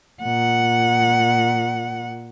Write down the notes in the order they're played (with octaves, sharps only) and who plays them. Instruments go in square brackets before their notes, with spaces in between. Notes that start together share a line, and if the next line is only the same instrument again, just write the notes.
[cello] A#2 F#5